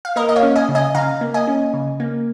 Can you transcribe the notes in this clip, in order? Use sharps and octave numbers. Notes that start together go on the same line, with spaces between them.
F5
A#3 A#4 D#5
D#5
C#5 F5
C#4
D#5 G#5
C#3
D#5 G#5
C#3 F5 A#5
A#3
D#5 G#5
C#4
C#3
A#3